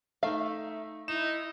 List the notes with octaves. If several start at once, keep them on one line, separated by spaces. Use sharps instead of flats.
A3 D#4 E5 F5
D#4 E4 D#5 E7